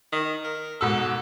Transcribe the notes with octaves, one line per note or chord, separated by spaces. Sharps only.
D#3
A#4
G#2 B2 A4 E6